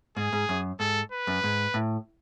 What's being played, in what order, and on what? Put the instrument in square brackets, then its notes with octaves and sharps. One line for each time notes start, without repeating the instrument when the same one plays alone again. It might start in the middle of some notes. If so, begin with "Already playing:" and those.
[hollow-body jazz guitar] G#2 [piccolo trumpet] G#4
[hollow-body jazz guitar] G#2
F#2
[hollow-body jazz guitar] G#2 [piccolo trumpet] A4
[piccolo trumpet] B4
[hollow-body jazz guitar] F#2
G#2
A2